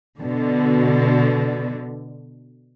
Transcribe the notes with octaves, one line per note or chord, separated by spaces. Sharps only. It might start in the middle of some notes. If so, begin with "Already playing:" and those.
B2 D3